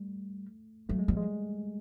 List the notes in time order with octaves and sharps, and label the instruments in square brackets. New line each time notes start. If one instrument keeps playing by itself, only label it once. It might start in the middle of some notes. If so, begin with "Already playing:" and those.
Already playing: [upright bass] G3 [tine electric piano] A3
[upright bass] F#3 [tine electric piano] A3
[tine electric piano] G#3
[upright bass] F3 [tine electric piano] G3
[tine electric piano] G#3